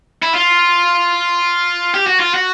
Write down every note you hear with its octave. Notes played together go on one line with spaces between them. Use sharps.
E4
F4
G4
F#4
F4
F#4